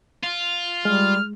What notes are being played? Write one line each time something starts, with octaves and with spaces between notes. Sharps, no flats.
F4
G3 G#3 F6